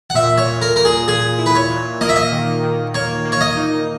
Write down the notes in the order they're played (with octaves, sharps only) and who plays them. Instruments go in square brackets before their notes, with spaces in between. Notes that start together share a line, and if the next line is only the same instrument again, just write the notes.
[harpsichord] F#5
[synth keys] A#2 [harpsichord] E5
[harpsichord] C#5
[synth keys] A#2
[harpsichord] A#4
[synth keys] A#2 [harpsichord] A#4
[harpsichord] G#4
[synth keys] A#2 [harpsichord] G#4
[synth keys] E4
[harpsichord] B4
C#5
[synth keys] A#2
[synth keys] A#3 [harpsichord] D#5
[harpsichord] E5
D#5
[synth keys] D#3
D#3
[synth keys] A#3 [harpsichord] C#5
[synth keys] A#3
[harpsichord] C#5
D#5
[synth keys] D#4